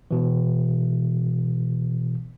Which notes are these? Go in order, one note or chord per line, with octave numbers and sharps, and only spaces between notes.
B2 E3